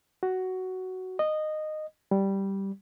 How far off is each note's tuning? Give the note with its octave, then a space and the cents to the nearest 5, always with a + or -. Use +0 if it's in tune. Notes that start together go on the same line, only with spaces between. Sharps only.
F#4 +10
D#5 -15
G3 -5